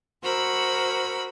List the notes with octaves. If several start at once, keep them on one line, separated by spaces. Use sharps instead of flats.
F#4 A#4 C5 B5 E6